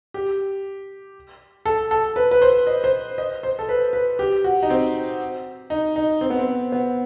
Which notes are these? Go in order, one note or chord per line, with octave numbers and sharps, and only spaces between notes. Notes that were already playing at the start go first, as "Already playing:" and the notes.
G4
A4
A4
B4
B4
C5
D#5
C5
D#5
C5
A4
B4
B4
G4
F#4
D#4
C4
D#4
D#4
C4
B3
C4
B3